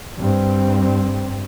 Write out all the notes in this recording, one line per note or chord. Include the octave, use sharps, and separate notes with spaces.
G2 C4